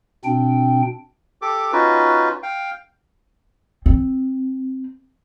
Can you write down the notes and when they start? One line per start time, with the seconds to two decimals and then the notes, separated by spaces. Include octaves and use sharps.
0.25 B2 C4 D4 G5
1.42 G4 A4 D6
1.72 C#4 D#4 F4 F#4 B4
2.43 F5 G5
3.86 C4